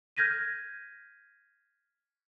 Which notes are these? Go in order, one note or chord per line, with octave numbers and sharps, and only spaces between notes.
F6 G6 G#6 A#6 B6 D#7